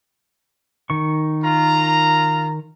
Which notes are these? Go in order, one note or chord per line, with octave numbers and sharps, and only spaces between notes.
D#3 C#6
F4 A#5